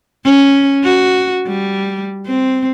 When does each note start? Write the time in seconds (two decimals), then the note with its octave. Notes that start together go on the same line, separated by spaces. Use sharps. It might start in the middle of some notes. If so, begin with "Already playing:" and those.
0.25 C#4
0.84 F#4
1.47 G3
2.27 C4